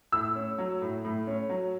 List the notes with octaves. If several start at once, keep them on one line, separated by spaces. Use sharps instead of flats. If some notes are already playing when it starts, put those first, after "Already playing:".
A2 E6
C#4
F#3
A2
A2
C#4
F#3